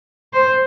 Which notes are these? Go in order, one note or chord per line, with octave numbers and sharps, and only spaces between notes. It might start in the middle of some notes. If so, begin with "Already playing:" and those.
C5